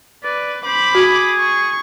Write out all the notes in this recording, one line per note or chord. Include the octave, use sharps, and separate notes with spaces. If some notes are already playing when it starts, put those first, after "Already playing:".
B4 D5
C5 B5 D6
F#4 G#4
C#6